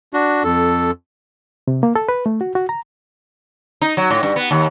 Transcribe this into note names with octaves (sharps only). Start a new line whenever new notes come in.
D4 F#4
F2 A4
C3
A#3
A4
B4
A3
F#4
F#4
A#5
D#4
F#3
A2
G2
B3
D#2